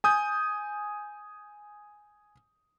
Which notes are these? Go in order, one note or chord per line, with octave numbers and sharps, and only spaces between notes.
G#5 D#6 G6